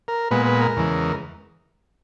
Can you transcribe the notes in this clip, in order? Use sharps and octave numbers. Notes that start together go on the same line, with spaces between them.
A#4
A#2 G#3 B3 B4
B4
A#4
E2 C#3 E3 G#3